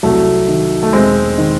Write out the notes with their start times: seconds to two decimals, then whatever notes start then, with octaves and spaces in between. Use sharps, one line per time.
0.03 C2 F#3 A3
0.48 D#3
0.83 A3
0.92 E1 G#3 C4
1.38 D#3